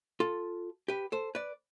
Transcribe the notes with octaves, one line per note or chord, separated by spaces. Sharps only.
F4 A4
G4 B4
A4 C5
B4 D5